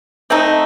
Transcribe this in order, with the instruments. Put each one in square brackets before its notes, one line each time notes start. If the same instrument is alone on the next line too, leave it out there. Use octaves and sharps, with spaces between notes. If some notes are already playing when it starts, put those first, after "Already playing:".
[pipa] A3 C4 D#4